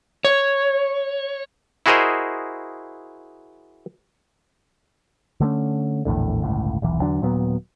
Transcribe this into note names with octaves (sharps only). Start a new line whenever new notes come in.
C#5
E4 F#4 G#4 A#4 C5 D#5
D3 A3 B3 C#4
A#1 E2 A2 D3
G1 C#2 A2
D#1 B1 E3
E2 D3 F#3 D4
D#1 A#2 F#3 B3